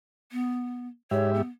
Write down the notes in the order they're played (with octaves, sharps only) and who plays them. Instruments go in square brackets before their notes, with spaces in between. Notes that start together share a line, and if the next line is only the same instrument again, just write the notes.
[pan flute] B3
[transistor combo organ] G#2 G4 E5 [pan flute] C#5
[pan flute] B3